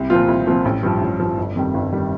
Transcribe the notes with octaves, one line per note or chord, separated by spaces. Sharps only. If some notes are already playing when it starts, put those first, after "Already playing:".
Already playing: C2
A#2 F3 C4 F4
C2
A#2 F3 C4 F4
A1
G2 F3
A1
G2 F3
G1
F2 D#3 G3
G1
F2 D#3 G3